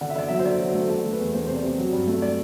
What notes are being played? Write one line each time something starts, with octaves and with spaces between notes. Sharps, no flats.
D3 F#5
E5
D3 D5
F#3 E5
C5
D3 D5
F#3
C5
A3
A3 A4
A3
B4
E2
A3 C5
C3 C5
D5
C3
F#3
G2
A3
D5